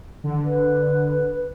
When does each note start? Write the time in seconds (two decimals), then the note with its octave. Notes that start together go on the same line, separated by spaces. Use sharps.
0.24 D3
0.44 B4